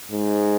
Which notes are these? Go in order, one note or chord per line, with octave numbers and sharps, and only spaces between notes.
G#2